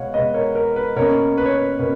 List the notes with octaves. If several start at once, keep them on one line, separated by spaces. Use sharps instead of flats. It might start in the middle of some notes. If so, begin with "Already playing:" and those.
Already playing: B2 G#3 C#5 F5 F#5
B2 G#3 B3 B4 D#5
A#4 C#5
A#4
B4
B2 A#3 C#4 A#4 C#5
B4
C#5
B4
B2 A#3 C#4 B4